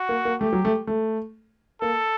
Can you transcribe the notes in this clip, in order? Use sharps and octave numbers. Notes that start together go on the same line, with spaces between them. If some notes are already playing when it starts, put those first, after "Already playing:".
Already playing: F#4
A#3
A#3
A3 G4
F#3
A3
A3
A#3 A4